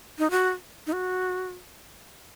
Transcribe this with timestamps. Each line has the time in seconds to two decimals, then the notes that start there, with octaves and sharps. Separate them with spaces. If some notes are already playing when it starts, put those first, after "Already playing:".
0.19 D#4
0.31 F#4
0.87 D#4
0.93 F#4